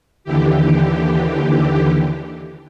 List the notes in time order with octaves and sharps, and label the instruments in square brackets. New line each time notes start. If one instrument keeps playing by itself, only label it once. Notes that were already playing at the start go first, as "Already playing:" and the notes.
[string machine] D#2 D3 E3 G4